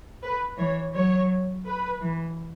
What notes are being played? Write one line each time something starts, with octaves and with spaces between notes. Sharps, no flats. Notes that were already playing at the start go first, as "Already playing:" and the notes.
B4
E3 C#5
F#3 C#5
B4
E3